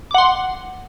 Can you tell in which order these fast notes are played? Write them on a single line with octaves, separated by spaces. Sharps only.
D6 F#5 C6